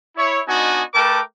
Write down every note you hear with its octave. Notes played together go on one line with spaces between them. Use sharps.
E4 C#5
B3 D4 D#4 F#4 D#5 G#5
A3 A#4 B4 G5 A5 D6